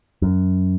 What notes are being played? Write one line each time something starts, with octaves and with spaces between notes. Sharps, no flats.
F#2